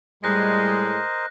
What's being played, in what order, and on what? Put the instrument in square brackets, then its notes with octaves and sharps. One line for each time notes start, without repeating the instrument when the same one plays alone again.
[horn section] A2 G#3 [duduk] G3 [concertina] A#4 C5 D#5 [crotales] F#6 A#6